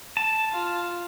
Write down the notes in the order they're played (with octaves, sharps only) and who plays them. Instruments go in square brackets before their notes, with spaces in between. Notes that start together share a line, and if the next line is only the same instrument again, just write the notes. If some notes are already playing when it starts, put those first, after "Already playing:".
[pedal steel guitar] A5
[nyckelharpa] F4